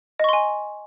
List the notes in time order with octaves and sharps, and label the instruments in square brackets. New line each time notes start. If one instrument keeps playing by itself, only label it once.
[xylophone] D#5
C#6
C6
G#5